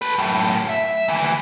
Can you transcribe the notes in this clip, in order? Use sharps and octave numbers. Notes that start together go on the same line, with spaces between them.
A4 B4
F#2 A2
E5
D2 E3